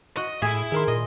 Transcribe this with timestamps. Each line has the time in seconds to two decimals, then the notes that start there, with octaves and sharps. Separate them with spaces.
0.17 F#4 D#5
0.42 A2 E4 G#4 E5
0.72 D#3 G#4 A#4 C6
0.88 A#2 D#5